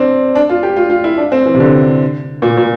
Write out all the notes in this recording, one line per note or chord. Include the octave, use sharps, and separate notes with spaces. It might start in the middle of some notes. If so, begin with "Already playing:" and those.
Already playing: C4 D4
D4
F4
G4
F4
F4
E4
D4
C4
E3
C3
D3
A#2
A#2